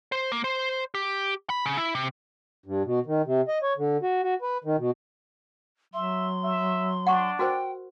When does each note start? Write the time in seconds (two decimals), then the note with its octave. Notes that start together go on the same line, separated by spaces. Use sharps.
0.12 C5
0.32 A#3
0.44 C5
0.95 G4
1.50 B5
1.66 C#3
1.77 E4
1.95 C3
2.66 G2
2.85 B2
3.06 D#3
3.26 C3
3.48 D#5
3.63 C#5
3.77 D3
4.03 F#4
4.23 F#4
4.42 B4
4.64 D#3
4.78 B2
5.94 F#3 E5 C6
6.43 E5
7.07 D4 F#5 C#6
7.39 F#4 A#4 C5 G5